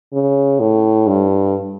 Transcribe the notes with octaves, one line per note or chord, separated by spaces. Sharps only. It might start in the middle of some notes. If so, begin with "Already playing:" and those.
C#3
A2
G2